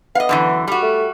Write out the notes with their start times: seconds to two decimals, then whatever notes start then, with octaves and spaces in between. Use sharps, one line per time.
0.15 B3 D#5 F5
0.29 F#2 D3 E3
0.67 G3 F#4
0.82 A3